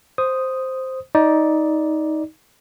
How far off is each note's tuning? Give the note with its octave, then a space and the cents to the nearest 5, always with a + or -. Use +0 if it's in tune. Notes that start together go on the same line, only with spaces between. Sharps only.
C5 +0 D#6 +0
D#4 +15 D5 +0